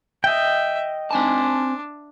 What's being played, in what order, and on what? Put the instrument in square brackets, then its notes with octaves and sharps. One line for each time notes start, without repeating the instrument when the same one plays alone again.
[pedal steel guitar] D#5 G5 [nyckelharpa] E5
[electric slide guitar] C4 G#5 A5 [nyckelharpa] D4